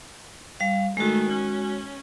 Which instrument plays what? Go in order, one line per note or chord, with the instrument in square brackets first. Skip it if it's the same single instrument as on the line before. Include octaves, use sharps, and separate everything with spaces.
[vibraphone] G3 F5
[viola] D#3 A3 [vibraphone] G#3 F#4
[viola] C#4